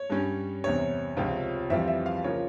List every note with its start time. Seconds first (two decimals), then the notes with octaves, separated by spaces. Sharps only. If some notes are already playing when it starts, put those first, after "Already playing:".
Already playing: C#5
0.10 G2 G3 C#4
0.64 E2 C3 G3 C#5
1.17 C#2 C3 F3 C4 F4
1.70 F2 E3 G3 C4 F4 E5
1.88 E5
2.06 F5
2.24 C#3 F3 A#3 F4 C#5